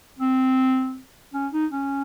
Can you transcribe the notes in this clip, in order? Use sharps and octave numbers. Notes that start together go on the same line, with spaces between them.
C4
C#4
D#4
C#4